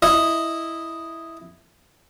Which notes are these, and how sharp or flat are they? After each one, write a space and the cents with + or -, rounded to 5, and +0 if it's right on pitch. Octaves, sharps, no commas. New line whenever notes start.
E4 +0 D#5 +0